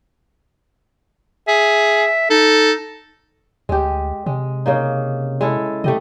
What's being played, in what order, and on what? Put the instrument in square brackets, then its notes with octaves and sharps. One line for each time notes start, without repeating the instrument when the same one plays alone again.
[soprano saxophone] G#4 [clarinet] E5
[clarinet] D#4 [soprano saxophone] A4
[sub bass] D2 [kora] G#3 G4
[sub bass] C3 [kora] G#3
[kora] C#3 A#3 D#4
G#3 E4 A4
[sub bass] C3 [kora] A3 G4 D#5